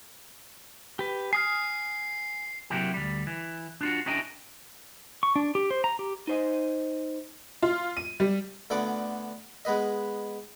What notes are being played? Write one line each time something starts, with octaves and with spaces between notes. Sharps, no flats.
G4 B4
G#5 D#6 F6 C7
C3 F#3 A#3 E4 G4
D2 G3
E3
D4 F4 F#4
C#4 D4 E4 G4 D#5 A#5
C#6
D4
G4
C5
A#5
G4
D#4 C5 D#5
F4
D#7
G3
D2 D3 B3 D5 F#5 D6
G#3 B3 B4 D#5